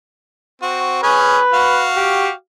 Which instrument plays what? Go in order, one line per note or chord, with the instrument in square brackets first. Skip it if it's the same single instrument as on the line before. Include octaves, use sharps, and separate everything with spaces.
[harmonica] C4 F#4
[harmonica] C#4 G#4 [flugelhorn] B4
[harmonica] F#4 F5
[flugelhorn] G4